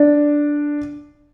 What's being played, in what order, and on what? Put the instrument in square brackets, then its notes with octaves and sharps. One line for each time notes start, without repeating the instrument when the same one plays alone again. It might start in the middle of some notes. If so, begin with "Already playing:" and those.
Already playing: [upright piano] D4 D5